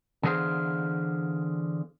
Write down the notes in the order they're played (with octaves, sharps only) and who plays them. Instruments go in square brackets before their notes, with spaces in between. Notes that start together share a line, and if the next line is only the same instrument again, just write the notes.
[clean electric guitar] D3 E3 B3 G#4 C5 F5